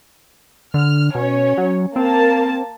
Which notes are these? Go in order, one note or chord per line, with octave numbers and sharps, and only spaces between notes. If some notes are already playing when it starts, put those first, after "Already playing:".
D3 F6
B2 C#4 C#5
F#3
A#3 C4 A5